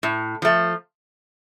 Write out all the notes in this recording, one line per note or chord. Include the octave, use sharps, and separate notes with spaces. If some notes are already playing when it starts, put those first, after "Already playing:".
A2
F3 A3